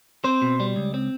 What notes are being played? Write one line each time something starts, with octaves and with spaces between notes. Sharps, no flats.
C4 C5
B2
G3
C#2
C4